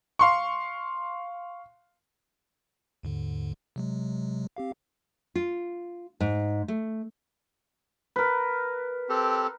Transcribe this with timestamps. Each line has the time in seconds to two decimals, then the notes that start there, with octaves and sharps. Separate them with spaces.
0.19 F5 C6 C#6
3.03 D#2 G#2 D3
3.76 C3 F#3 G#3
4.57 C4 G4 F5
5.35 F4
6.20 G#2
6.68 A3
8.16 A#4 B4
9.09 C4 G4 A4